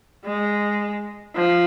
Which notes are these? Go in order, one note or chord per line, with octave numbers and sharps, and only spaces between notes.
G#3
F3